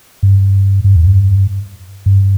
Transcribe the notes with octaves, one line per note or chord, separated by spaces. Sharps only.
G2
G2
E2
G2
G2